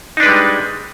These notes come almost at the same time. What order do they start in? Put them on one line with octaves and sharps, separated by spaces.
D#4 D4 B4 G#3 G3